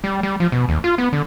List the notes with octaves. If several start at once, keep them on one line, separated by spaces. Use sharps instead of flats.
G3
G3
F3
B2
D#2
F4
B3
D3